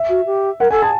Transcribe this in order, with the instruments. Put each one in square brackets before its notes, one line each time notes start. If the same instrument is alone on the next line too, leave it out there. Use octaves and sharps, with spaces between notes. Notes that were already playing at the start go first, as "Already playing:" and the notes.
Already playing: [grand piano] E5
[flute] F#4
G4
[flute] A#4 [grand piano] F#5
[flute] A4 [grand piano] G#5
[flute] G#4 [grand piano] A5